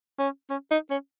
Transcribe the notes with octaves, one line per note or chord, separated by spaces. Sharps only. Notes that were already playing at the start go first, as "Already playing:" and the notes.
C#4
C#4
D#4
C#4